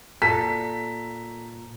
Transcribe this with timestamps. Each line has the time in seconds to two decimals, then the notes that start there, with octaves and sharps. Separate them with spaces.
0.22 A#2 A4 A#5 B6